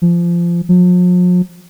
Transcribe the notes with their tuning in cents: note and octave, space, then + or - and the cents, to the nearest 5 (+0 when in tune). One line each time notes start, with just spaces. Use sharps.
F3 -20
F3 +45